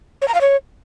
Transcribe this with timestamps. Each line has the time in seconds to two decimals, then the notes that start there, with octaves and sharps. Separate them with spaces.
0.22 C#5
0.28 A#5
0.35 F5
0.41 C#5